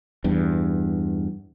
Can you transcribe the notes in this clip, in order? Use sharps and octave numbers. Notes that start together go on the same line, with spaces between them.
E2 G2